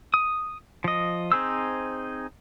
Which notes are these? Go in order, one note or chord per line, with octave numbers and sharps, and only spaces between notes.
D#6
F3 D#5
C4 D#4 G#4 C5 E6